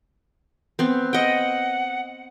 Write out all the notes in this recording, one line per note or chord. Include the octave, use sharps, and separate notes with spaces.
B3 C4
D#5 F#5 G5